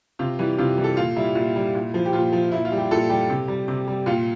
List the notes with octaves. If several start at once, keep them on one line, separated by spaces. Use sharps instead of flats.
C3 F4
E3 G3
C3 F4
E3 G3
A4
A#2 F4
G3 E4
A#2
G3
A#2
F3
G4
A#2 F4
F3
A#2 E4
F4
G3
G4
A#2 A4
G3 G4
C3
G3
C3
G3
A#2 F4